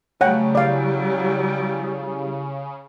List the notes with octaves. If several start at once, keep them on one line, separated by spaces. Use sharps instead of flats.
C#3 F#3 G3 A3 C#5 F#5 G5
E4 G4 D5 F5